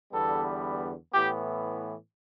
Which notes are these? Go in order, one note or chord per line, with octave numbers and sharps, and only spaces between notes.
E2 D3 G3 B3 A4
A2 E3 B3 G4